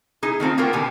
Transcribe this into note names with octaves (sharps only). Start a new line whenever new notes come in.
D#4 E4 G#4
D#3 A3 C4 F4
A#3 B3 F4 F#4 A#4 G5
B2 D3 D#3 G4 G#5